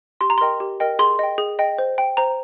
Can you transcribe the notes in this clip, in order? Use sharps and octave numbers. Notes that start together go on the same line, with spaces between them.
G4 C6
A#5
A#4 D#5 G5 C6
G4
A#4 D#5 G5
G#4 C6
D#5 G5
G#4
D#5 G5
C5
G5
C5 A#5